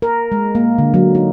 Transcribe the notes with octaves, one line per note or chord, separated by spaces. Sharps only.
A#4
G#3
A#3
D3
F#3
D#4